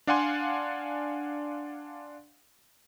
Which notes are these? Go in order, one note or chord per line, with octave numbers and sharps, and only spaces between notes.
D4 D5 F5 F#5 G#5 C6